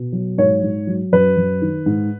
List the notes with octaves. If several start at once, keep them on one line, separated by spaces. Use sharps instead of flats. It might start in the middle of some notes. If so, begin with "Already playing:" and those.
Already playing: B2
F#3
G#2 C#5
G#2
F#3
F#2 B4
F#2
D#3
G#2